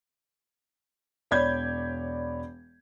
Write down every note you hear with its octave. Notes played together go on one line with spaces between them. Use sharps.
E1 C#5 D5 B5 G6 G#6